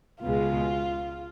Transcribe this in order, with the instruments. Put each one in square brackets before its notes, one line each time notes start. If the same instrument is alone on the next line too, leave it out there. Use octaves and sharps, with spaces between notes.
[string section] C#2 B2 G#3 [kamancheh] F4